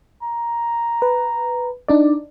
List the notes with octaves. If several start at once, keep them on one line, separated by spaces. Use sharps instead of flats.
A#5
B4
D4 D#4 D5